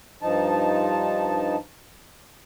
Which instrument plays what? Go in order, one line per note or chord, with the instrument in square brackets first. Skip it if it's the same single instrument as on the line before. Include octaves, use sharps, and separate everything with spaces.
[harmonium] G2 F3 D#4 A5